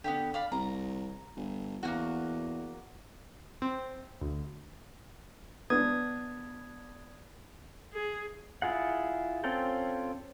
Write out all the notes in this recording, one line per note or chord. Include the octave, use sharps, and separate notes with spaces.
D3 B3 E4 G4
D5 F5 B5
C2 A#5
G1
E2 A#3 C#4 F#4
C4
D2
B3 D4 D#6 G#6
G#4
E4 F4 G#4 F#5
C4 C#4 F4 A4 G5